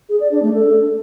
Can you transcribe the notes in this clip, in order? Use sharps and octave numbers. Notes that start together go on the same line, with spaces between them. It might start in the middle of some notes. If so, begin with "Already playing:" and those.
G#4
D5
D4
A3
A4